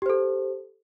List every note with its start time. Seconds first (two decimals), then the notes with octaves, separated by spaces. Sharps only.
0.02 G4
0.06 C5
0.10 A4